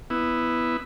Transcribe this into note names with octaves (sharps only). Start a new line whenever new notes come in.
B3 E4